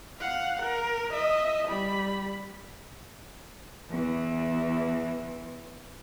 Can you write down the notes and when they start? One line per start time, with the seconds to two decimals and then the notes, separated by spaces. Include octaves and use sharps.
0.19 F5 F#5
0.62 A#4
1.11 D#5 E5
1.67 G3 B5
3.90 E2 E3